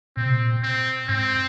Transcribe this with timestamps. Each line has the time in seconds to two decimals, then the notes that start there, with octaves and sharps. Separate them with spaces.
0.17 A#2 C4
0.26 C3
0.34 A#2
0.63 C4
1.08 G#2 C4